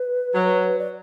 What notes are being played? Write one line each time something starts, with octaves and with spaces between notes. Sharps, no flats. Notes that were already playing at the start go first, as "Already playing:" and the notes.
Already playing: B4
F#3
D5